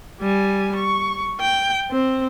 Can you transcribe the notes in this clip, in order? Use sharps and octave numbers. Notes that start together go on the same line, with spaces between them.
G3 G#5
C#6
G5
C4